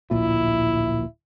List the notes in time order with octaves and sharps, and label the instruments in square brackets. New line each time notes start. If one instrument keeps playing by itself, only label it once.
[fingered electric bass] D1 A#1 A#2 [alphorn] E4